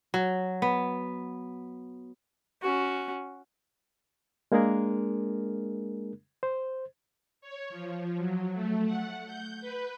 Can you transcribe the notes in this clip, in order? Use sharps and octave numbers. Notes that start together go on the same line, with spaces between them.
F#3
B3
C#4 F#4
G#3 A#3 D4 G#4 A#4
C5
C#5
F3
F#3
A3
F#5
G6
B4